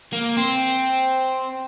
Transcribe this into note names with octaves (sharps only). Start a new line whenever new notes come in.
A#3
C4